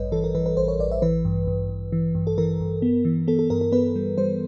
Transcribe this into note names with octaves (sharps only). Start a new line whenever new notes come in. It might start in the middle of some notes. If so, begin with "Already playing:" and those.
Already playing: A1 G2 G3 B4 C#5 D#5
E3 A4
A#4
E3 B4
B4
A1 C5
C#5
A1 D5
E5
E3 B4
G2
G2
G2
E3
G2
A4
E3 A#4
G2
B3
E3
B3 A4
A4
G2 A#4
A#4
B3 B4
G3
G3 C5